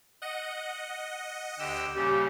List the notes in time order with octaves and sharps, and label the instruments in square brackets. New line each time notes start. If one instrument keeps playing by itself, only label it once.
[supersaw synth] D#5 F#5
[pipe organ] D2 G4 E6
[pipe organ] A#2 C#3 G3 [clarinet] G4